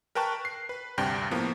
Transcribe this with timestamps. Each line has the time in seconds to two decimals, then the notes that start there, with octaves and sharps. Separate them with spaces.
0.15 A#4 B4 G5 A5 C#6 F#6
0.45 C7
0.69 B4
0.98 D2 G2 C3 D4 G5 G6
1.31 A2 F3 A#3 B3